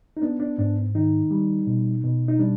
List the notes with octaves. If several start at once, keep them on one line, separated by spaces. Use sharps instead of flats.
D#4
B3 D4
D4
G#2 D4
D#3 D#4
G3
B2
B2
D#4
G3 D4